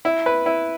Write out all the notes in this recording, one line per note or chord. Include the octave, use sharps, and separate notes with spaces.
E4
B4
E4